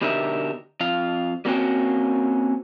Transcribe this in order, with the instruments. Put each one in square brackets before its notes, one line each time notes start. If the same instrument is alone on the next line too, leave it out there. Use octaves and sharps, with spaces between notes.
[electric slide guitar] B2 D3 D#4 G4 A#4 E5
F2 F4 F5
G3 A#3 C4 C#4 F#4 G5